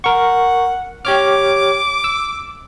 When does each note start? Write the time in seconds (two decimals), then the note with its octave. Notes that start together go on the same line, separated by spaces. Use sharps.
0.04 A#4 F#5 C#6
1.05 G4 C#5 D6 F6
2.04 E6